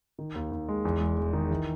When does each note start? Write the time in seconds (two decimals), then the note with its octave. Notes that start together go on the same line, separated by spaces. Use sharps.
0.19 D#3
0.35 D#2
0.52 D#2
0.69 G#3
0.85 E2
1.00 E1
1.18 E1
1.33 D#3
1.51 E3